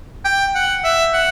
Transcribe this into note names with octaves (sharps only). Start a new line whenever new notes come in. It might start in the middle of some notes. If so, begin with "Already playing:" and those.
G5
F#5
E5
F#5